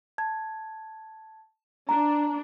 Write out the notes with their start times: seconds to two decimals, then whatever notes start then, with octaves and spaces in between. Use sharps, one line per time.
0.18 A5 G#6
1.89 D4 A#5